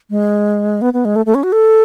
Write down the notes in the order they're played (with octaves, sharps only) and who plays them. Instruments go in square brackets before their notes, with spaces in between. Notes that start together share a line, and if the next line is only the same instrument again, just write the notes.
[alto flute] G#3
B3
B3
G#3
A3
A3
C#4
F#4
A4